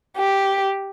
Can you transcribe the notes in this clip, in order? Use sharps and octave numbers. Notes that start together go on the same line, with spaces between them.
G4